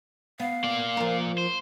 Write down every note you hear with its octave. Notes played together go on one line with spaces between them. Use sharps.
B3 F5
A#3 D5
F3 A#4
C5